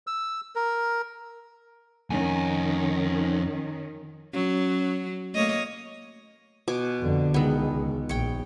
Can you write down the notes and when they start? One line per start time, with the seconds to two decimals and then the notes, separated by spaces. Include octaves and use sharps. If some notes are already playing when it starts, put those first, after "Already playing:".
0.07 E6
0.55 A#4
2.10 F2 D#3 C#4 G#5
4.34 F#3 C#4
5.34 A3 A#3 C#5 D#5
6.68 B2 G#5 D6
7.01 F2 D3
7.34 C#2 D#3 G#3 B3
8.09 A#1 C#5 G5